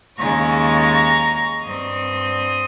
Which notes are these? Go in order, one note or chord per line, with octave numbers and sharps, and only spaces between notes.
D#2 C#3 G#3 A#5 C#6
G2 G3 C4 C6 D#6